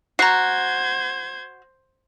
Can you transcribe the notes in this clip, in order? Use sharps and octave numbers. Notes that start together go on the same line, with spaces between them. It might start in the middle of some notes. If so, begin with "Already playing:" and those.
F#4 C5 A#5 G#6 C7